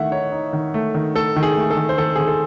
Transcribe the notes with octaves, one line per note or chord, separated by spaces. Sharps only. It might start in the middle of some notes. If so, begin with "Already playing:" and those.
Already playing: D#3 A3 E5 F#5
D#4 C#5
D#4
D#3
A3
D#3
A3 A4
D#3
G#4
A3
A4
D#3
C5
D#3 A4
D#3 G#4
A4